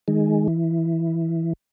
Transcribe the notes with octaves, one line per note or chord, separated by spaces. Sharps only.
D#3 G#3
E3